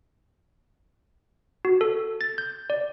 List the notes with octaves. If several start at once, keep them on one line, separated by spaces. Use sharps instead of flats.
F#4
A4
A6
G6
D5